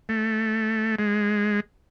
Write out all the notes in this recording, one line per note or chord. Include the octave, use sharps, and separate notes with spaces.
A3
G#3